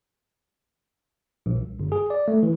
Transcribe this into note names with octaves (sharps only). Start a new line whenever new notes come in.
A#1
C2
G1
G#4
D5
A3
E3